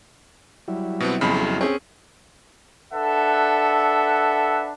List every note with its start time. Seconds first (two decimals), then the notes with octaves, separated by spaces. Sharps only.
0.68 F#3 G3 E4
1.00 B2 B3 C4
1.21 B1 F2 C#3 B5
1.61 C4 C#4 G#4
2.93 D4 A4 B4 E5 F#5